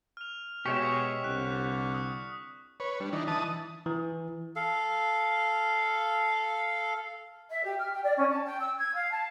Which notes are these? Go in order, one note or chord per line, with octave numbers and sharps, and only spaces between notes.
F6 F7
B2 G#3 G4 C#5 E5 C#6 B6 C#7
C2 D3 F#6
D#6
B4 C#5
G3 D4
E3 D4 D#4
E3 A5 D#6
E3
A4 F5
E5
G4
F6
G5
D5
C#4
A5
G5
E6
G#6
F5
A5